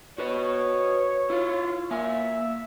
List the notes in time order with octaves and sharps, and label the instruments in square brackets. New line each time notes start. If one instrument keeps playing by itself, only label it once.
[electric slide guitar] F#4 B4 D#5 [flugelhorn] C#5
[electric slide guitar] E4 F4
[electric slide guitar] A#3 G#5 [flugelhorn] E5